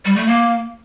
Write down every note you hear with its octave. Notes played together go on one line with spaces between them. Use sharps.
G3
A3
A#3